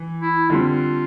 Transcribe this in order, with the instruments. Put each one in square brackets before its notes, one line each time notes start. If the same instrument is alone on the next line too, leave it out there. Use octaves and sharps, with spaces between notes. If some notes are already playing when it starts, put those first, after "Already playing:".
Already playing: [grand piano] E3
[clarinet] E4
[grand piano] D3 G3 C4 [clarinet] F4